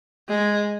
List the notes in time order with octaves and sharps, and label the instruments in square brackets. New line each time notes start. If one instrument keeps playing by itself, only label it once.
[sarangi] G#3